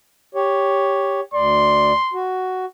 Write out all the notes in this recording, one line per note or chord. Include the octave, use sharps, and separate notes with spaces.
G4 C#5
D2 D5 C6
F#4